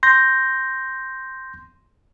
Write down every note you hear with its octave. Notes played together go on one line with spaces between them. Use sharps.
C6 G6 A#6